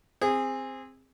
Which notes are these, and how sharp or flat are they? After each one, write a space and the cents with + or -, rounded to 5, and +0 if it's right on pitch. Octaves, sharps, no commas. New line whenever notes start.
C4 +0 G#4 -20